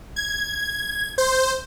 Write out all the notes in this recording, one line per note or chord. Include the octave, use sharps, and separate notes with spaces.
G#6
C5